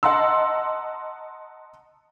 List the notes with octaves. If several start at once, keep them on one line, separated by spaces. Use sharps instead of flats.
D#5 F#5 A5 A#5 C6 E6